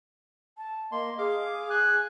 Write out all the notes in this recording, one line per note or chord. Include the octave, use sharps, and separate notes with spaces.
A5
A#3 D#5 C6
G#4 F5 D6
G#5 F#6